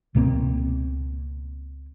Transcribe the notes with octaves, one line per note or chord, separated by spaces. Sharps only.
C#2 B2 A#3 C4